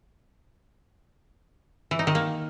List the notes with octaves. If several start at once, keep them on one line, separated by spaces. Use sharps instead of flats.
E3
D#4
D#3
A#3